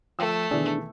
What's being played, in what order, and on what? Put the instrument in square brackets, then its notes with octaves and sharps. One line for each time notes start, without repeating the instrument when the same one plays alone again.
[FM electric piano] F3 A4 [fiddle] A3 [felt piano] G5 E6
[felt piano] B2 D#3 E3 [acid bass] D4 [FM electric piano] G#4